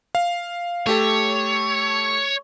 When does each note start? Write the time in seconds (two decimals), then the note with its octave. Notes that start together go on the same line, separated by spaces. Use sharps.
0.15 F5
0.87 A3 G4 A4 C#5